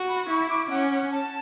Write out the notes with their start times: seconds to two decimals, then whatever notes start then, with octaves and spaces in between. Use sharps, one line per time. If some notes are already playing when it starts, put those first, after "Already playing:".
Already playing: F#4
0.08 B5
0.29 E4 C#6
0.49 D6
0.70 C#4 F#5
0.91 F#5
1.11 A5